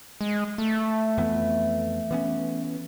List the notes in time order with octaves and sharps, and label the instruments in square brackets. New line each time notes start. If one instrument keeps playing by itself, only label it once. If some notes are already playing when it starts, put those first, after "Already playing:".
[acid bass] G#3
A3
[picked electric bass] F2 E3 B3
E3 B3 C#4